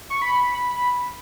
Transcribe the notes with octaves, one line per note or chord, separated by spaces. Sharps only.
C#6
B5
B5